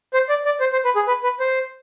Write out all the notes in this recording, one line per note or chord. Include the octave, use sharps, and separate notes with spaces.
C5
D5
D5
C5
C5
B4
G#4
B4
B4
C5